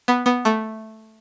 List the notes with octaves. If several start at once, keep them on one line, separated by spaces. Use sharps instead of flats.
B3
B3
A3